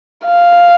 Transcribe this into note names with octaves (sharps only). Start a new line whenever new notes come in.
F5